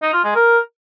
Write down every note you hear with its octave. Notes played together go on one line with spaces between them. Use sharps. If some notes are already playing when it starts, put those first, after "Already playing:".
D#4
F4
G#3
A#4